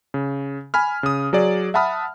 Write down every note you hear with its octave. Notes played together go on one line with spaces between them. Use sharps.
C#3
G#5 B5 F6
C#3 D#6
F#3 G#4 D5
E5 F#5 A5 B5 D#6 F6